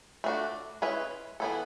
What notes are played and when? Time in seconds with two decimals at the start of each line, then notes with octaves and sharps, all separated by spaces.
0.24 A3 D4 F#4
0.82 G#3 C#4 E4 B4
1.40 E3 B3 E4 A4